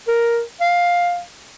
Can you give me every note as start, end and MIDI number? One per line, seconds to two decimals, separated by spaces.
0.08 0.41 70
0.61 1.21 77